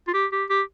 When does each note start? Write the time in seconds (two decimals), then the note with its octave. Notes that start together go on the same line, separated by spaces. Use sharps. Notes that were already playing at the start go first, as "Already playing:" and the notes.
0.07 F4
0.14 G4
0.32 G4
0.49 G4